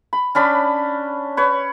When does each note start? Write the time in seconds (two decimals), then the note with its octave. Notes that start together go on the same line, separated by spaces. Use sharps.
0.13 B5
0.35 C#4 D4 B5
1.37 B4 C#5